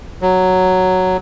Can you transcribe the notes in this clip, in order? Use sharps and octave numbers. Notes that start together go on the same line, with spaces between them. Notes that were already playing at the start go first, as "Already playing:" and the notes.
F#3